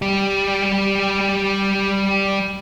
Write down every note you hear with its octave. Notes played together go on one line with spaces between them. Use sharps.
G3 G4